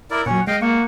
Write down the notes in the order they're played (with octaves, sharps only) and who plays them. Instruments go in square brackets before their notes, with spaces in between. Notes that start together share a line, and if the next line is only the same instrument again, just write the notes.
[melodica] E4 A#4 D5
[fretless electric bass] A#2 F#3 [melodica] C#4 C#5 F#5
[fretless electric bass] G#3 [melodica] D#5 F5 G5
[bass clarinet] A#3 [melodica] F#5 C#6